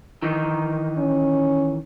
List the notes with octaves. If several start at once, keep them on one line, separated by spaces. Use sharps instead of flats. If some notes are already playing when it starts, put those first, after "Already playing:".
D#3 E3 D#4
C#4